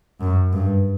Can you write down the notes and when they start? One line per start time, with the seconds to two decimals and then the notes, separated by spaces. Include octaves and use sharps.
0.21 F#2
0.53 G2